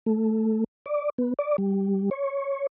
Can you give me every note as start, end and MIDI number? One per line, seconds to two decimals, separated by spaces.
0.06 0.64 57
0.86 1.10 74
1.18 1.33 59
1.39 1.56 74
1.58 2.10 55
2.11 2.67 73